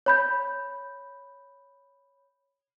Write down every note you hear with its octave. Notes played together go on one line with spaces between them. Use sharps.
C#5 B5 G6